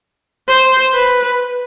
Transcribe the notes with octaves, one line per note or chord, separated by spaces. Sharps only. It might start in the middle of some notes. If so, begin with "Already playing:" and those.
C5
B4